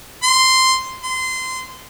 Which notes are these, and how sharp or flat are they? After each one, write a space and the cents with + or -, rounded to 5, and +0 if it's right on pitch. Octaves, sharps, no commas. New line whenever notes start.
C6 -5
C6 -20